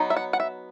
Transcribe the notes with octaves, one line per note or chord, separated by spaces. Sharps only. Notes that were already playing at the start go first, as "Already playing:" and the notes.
Already playing: F#3 B3 D#4
E5
F#5
F#5
E5